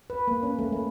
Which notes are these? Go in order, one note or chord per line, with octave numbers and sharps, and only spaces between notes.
B4
A#3
C#4
A3
A3